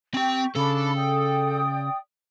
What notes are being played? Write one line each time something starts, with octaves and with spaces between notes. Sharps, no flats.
C4 G4 G5 C#6
C#3 D4 A4 B5 D6
D5 G5 D#6